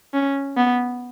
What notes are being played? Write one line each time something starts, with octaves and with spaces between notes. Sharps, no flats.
C#4
B3